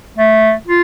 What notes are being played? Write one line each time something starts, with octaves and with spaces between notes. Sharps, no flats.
A3
F4